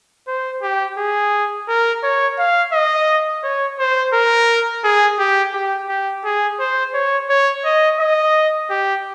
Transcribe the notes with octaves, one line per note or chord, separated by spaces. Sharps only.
C5
G4
G#4
A#4
C#5
F5
D#5
C#5
C5
A#4
G#4
G4
G4
G4
G#4
C5
C#5
C#5
D#5
D#5
G4